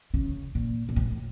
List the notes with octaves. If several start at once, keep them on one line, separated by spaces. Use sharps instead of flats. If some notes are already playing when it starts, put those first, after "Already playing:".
C#3
A#2
A#2
A2